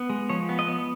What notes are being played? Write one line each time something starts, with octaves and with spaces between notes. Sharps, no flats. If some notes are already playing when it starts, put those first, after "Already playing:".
Already playing: B3
G#3
F3 C#5
B3
D#5
B3